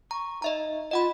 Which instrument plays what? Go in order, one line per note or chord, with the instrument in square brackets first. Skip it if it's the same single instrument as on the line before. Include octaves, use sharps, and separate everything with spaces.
[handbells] A#5 [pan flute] C#6
[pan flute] D#4 [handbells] D#5 E5 A#5
[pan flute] F4 [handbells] D#5 F#5 B5